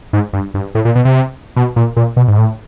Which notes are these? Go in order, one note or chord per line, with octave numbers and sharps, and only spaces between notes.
G#2
G2
G2
A2
A#2
B2
C3
B2
A#2
A#2
B2
G#2
A2